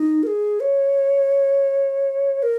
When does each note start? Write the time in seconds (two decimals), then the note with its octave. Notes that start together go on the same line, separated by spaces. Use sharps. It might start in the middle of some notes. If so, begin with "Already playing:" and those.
Already playing: D#4
0.23 A#4
0.27 G#4
0.60 C#5
2.43 A#4